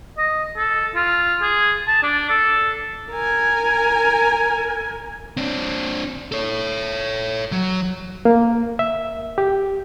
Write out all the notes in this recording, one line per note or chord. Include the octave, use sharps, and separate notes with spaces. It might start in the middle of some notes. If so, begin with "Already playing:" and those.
D#5
A4
F4
G#4
A5
D4
A4
A#4 G#5
C4 D4
A4 C#5
F#3
A#3
E5
G4